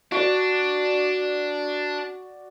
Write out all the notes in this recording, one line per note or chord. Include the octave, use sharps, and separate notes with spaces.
D4 F#4 D5